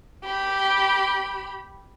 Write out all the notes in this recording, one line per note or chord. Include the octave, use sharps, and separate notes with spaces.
G4 B5